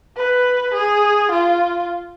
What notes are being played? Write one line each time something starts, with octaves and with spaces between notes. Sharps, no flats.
B4
G#4
F4